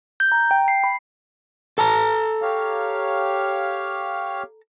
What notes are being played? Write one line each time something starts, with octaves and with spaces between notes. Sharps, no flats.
G6
A#5
G5
C7
B5
A4 A5 A#5
G4 C#5 F5